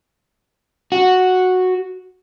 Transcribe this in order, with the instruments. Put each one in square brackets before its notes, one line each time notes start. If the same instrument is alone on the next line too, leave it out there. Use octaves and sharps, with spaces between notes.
[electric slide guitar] F#4